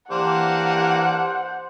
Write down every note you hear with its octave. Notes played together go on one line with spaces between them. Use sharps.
E3 A#3 D4 G4 C5 F#5 D6